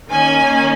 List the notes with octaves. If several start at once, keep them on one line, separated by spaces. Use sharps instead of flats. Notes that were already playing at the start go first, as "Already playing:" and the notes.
D#3 A#3 C#4 G#5